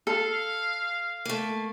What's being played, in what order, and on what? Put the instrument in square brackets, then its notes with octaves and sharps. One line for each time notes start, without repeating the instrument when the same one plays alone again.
[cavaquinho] A4 [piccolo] F5
[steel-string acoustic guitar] A3 A#3